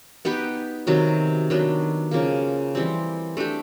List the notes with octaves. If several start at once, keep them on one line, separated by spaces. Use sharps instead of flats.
B3 D#4 G4 B4
C3 D#3 F#3 B3
D#3 F#3 B3 D4
C#3 F3 A#3
E3 G3 C4
A3 D4 G4